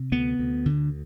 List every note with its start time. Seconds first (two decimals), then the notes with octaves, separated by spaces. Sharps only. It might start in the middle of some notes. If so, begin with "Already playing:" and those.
Already playing: C3
0.12 D2 B3
0.39 D2
0.66 D3